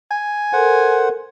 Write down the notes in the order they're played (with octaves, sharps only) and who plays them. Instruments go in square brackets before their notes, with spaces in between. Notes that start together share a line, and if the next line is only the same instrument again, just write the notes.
[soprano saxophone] G#5
[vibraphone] A4 A#4 [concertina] C5 F#5